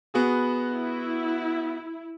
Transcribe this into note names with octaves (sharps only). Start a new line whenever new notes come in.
B3 F#4 G#4
E4